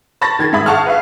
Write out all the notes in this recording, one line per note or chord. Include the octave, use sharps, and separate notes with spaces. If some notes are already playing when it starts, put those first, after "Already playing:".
A5 B5 C#6 A6 A#6
D#3 G#6 A6
G#2 E5 B5 D#6
F5 F#5 A5 C#6 F6
B4 E5 F5